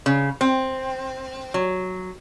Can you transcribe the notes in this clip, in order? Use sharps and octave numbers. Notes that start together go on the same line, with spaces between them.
C#3
C4
F#3